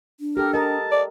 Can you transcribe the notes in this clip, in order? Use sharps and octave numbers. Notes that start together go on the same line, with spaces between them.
D4
G4 A4 A#4
A#4 D#5 A5
D5